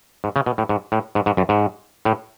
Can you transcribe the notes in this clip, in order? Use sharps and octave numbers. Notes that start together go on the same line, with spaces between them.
G#2
C#3
B2
A2
G#2
A2
G#2
G#2
F#2
G#2
A2